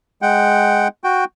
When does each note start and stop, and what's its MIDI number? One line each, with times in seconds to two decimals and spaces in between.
0.22 0.88 56
0.22 0.88 78
0.22 0.88 79
1.04 1.25 66
1.04 1.25 79